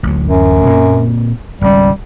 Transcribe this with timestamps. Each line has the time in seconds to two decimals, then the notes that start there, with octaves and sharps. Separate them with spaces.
0.03 A1 D2 F#3
0.26 F#2
0.65 A#2 A#3 C4
1.61 G#1 C#2 G3 C#4